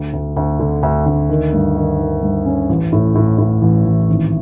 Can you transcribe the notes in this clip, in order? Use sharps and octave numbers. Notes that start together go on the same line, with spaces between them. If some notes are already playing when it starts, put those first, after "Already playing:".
Already playing: D2
D2
D2
D3
D2
D2
D#3
G2
D#3
D#3
G2
C#4
A1
A2
A2
A2
A1
A1
G#1